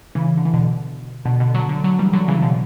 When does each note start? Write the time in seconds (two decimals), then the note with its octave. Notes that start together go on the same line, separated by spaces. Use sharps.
0.15 C#3 E3
0.37 D3
0.45 E3
0.53 B2 D3
1.25 B2 D3
1.40 B2 D3
1.54 D3 F#3
1.69 D3 F#3
1.84 D3 F#3
1.99 E3 G3
2.13 D3 F#3
2.28 C#3 E3
2.42 B2 D3